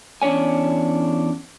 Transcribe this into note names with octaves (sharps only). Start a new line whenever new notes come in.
E2 C#4 D4 C#5 G#5